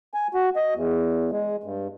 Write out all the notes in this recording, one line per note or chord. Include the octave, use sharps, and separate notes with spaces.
G#5
F#4
D#5
E2
G#3
G2